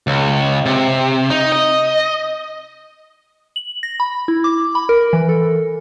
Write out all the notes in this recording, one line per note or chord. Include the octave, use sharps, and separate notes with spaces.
C#2
C3
D#4
D#5
F#7
A#6
B5
E4
D6
B5
A#4
E3
A4